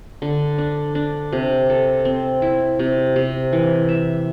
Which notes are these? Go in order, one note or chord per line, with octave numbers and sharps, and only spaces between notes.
D3
D4
D4
C3
A4
C4
E4
C3
C3
E3
E5